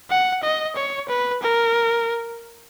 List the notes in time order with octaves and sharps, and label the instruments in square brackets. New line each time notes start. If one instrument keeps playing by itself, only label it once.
[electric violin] F#5
D#5
C#5
B4
A#4